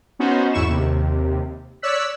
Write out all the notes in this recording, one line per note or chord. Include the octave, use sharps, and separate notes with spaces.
B3 C#4 D#4 F#4 C5
E2 G#2 E4 C#6 E7
D#2 C3
C#5 D5 E6 F#6 B6